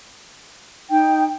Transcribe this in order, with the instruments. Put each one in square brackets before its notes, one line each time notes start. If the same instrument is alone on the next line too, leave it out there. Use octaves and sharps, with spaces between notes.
[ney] D#4 [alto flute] G5